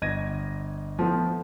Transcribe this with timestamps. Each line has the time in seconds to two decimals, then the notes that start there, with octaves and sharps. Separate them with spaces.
0.02 G1 D#5 G#6 A#6 D#7
0.99 F3 A3 B3 E4 C5